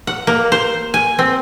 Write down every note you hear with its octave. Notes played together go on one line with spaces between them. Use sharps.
F#5
A#3
C5
G#5
C4